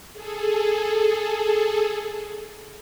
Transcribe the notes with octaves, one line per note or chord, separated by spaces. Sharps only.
G#4 A4